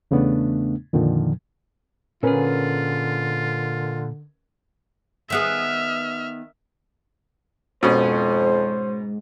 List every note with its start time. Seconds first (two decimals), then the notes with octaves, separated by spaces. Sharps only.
0.11 E2 C#3 A3 B3 D4
0.93 F2 A#2 D3 D#3 F3
2.23 A#2 D3 C#4 F4 G#4 A#4 B4
5.30 D#3 B3 G#4 E5 F6
7.83 F2 G#2 B2 C#4 C5